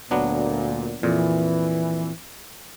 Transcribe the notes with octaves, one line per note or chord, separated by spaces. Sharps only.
D2 A#2 F#3 B3 D4
F2 A#2 E3